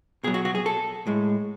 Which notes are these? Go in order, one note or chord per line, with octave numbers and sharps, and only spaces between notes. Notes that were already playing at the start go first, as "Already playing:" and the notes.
B2 F#3 G#4
F#4
F#4
G#4
A4
A2 G#3